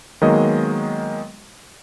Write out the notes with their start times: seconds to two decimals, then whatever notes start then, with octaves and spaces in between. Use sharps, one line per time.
0.22 D#3 F#3 G#3 A#3 B3 D#5